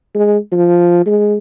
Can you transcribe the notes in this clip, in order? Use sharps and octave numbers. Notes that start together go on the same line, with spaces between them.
G#3
F3
G#3